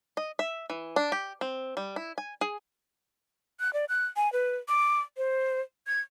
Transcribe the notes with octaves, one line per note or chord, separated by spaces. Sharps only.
D#5
E5
E3
D4
G4
C4
G3
E4
G#5
G#4
F#6
D5
F#6
G#5
B4
D6
C5
G#6